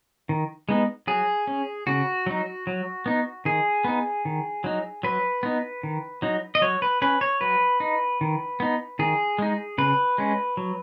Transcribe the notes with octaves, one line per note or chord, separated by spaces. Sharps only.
D#3
G#3 B3 D#4
F#3 G#4
C#4
C#3 F#4
F#3 D#4
F#3
B3 D#4
D#3 G#4
B3 D#4
D#3
F#3 D#4
F#3 B4
B3 D#4
D#3
F#3 D#4
D#5
F#3 C#5
B4
C#4 B4
C#5
F#3 B4
D#4
D#3
B3 D#4
D#3 G#4
G#3 D#4
C#3 B4
G#3 C#4
F#3